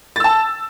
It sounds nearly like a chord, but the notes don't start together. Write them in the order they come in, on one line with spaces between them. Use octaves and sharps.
A6 E6 A5